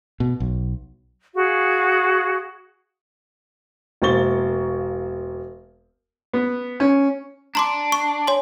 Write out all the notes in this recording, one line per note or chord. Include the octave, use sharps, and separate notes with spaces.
B2
B1
F#4 G#4 F5
E1 A#3 C5 C#6 A6 G7
B3
C#4
D4 A#5 C6 D6
C#6
C#5 G#5 C6